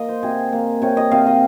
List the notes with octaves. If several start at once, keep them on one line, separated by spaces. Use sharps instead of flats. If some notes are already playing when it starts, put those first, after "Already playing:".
Already playing: A#3 D#5 F5
C5
C3 G#4
A#3
C3 C#5
D#5
C3 F5
D#5